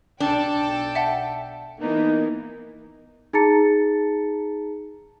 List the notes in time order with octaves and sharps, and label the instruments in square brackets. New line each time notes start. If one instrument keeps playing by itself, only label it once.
[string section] B1 A4 G5 [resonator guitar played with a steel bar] D4
[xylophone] E5 F#5 A5
[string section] E3 A#3 B3 [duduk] D#4
[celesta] D#4 G#4 A5 A#5 A6 C#7